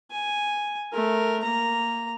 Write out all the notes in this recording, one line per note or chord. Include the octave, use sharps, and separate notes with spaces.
G#5
A3 A#4
A#3 A#5